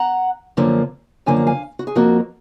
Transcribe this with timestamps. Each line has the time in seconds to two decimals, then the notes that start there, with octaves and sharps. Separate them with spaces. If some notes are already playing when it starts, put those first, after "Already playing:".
Already playing: F#5 A#5
0.57 F#2 D3 F3 A#3
1.26 F#2 D3 F3 A#3 G#5
1.36 F#5
1.47 F5 G#5
1.79 F#4
1.87 G#4
1.95 F2 F3 A#3 F#4 A#4